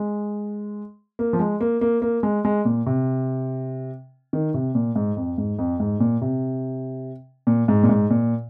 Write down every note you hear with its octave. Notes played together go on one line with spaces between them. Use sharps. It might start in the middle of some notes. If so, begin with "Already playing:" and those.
Already playing: G#3
A#3
F3
G#3
A#3
A#3
A#3
G#3
G#3
A#2
C3
D#3
C3
A#2
G#2
F2
G#2
F2
G#2
A#2
C3
A#2
G#2
A#2
G#2
A#2